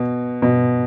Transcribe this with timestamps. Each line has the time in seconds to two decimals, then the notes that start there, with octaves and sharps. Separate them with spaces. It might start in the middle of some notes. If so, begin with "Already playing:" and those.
Already playing: B2
0.42 B2